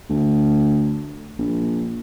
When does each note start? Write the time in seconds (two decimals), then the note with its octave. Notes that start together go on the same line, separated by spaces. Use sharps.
0.10 D2
1.38 A#1